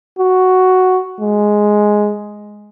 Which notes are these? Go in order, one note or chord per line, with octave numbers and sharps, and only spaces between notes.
F#4
G#3